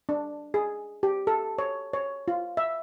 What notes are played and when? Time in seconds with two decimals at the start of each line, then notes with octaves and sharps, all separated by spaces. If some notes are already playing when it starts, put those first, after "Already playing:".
0.09 D4
0.54 G#4
1.03 G4
1.27 A4
1.58 C#5
1.93 C#5
2.28 F4
2.57 E5